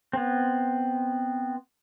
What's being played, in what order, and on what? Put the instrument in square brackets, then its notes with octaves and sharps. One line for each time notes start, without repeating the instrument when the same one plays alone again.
[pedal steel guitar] B3 C4